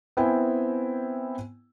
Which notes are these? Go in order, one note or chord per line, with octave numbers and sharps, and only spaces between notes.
B3 C4 E4 G5 G#5